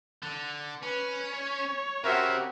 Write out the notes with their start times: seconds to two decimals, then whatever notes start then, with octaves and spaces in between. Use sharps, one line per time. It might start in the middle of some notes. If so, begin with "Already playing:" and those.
0.23 D3
0.83 C#4 B4
1.32 C#5
2.04 C#3 F#4 G4 A#4 C5 E5